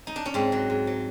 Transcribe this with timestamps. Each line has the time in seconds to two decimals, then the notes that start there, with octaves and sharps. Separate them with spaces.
0.07 D#4
0.16 D4
0.26 C#4
0.34 G#2 C4
0.52 F#3
0.70 G#2
0.87 F#3